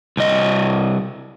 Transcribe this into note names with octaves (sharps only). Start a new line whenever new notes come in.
C2 D#5